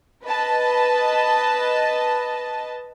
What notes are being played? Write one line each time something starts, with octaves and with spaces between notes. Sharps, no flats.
B4 D#5 A5